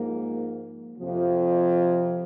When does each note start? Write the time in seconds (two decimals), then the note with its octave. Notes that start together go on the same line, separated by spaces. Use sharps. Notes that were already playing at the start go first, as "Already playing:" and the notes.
Already playing: G#2 F3 A#3
0.98 F2 C3 F3